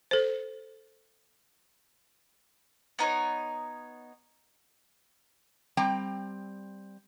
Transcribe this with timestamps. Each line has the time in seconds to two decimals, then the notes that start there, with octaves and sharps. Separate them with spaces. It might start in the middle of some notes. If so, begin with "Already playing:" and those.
0.11 A4 C5
2.99 B3 D#4 B4 C#5
5.77 G3 C4 G5 A#5